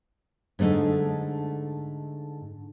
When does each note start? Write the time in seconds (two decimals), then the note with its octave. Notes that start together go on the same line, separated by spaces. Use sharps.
0.59 G#2 D3 A3 D#5